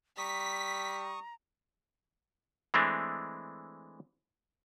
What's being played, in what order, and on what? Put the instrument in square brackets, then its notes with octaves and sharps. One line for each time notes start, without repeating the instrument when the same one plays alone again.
[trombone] G3 [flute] A#5 [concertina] C#6 D#6 [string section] B6
[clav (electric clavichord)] E3 G#3 A3 C4 D4